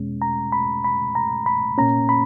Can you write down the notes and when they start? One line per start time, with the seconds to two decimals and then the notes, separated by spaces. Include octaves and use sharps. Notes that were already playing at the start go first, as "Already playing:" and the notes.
Already playing: E2 B2 G#3 C#4
0.22 A#5
0.52 B5
0.84 B5
1.15 A#5
1.46 B5
1.78 A#2 A#3 C#4 A#5
2.09 B5